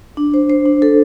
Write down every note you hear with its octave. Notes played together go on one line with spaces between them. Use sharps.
D4
C5
C5
D4
A4